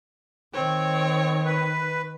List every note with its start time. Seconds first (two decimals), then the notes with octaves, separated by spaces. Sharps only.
0.53 D#3 C4 C#5
1.45 B4